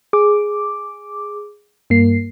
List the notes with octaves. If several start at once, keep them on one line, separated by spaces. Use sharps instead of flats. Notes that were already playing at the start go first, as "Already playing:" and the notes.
G#4 D6
G2 A#3 C7